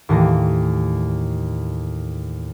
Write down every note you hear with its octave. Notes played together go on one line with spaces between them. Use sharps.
D#2 A2 E3 A#6